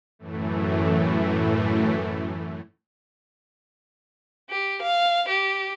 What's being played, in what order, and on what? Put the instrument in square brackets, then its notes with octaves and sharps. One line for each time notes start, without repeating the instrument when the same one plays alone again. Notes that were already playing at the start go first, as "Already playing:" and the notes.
[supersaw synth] F#2 A2 E3 A3
[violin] G4
F5
G4